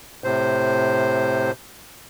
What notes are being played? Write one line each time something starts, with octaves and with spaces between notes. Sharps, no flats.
A2 C3 C5